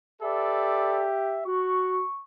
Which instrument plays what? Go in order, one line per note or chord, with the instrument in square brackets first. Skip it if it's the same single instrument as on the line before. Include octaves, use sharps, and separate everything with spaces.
[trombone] G4 [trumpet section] A4 B4 D5 [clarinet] E5
[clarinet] F#4 [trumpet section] C#6